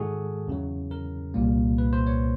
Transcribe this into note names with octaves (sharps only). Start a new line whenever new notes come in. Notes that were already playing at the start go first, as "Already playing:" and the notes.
Already playing: G#2 D#3 G#3 F#4 G#4 A4
E2 C#3 F#3
A#4
C2 A#2 G3 A#3
B4
C5
C#5